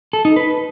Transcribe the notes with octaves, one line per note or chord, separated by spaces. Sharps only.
A4
D#4
B4